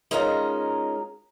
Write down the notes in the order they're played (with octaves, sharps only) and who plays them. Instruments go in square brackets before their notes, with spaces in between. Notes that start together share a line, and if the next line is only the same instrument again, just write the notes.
[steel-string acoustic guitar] G#3 C#4 D#4 F4 A#4 A#5